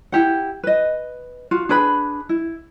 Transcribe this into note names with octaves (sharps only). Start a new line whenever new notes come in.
E4 G4 F#5
B4 D#5
F4 F#4
D4 G#4 B4 B5
E4